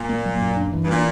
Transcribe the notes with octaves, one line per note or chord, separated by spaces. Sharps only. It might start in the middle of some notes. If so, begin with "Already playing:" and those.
Already playing: A#2
A#3
F#3
F#2
D4
E3
G2
A#2 D4